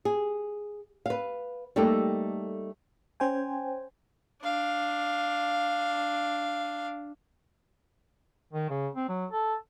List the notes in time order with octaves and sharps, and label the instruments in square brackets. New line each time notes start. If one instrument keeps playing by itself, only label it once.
[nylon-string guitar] G#4
B4 F5
G3 A3 A#3 D#4 G4 A4
[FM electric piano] C#4 C5 G5 G#5
[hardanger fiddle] D4 F5
[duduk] D#3
C#3
C4
F#3
A4